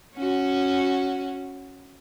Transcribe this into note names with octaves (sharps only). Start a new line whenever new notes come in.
C#4 F#4